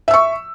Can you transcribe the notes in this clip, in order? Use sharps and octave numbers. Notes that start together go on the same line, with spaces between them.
E5 C#6 E6